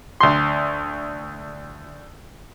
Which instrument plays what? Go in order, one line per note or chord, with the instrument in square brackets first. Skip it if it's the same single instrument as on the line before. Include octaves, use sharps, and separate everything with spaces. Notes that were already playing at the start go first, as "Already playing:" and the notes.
[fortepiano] D2 C6